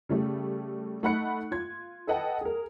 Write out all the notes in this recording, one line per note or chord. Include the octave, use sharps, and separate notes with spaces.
C#3 G3 A3
A3 D#4 F#5 B5 F#6 C#7
F4 G#6
A4 B4 D#5 F#5 G5 A5
G#4 A#4